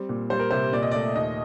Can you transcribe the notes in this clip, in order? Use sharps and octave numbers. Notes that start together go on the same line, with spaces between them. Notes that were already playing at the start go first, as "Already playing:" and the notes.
Already playing: G3 C4
A#2
G3 C5
A#4
C3 C5
A#2 D5
D#5
D5
A3
D#2 D#5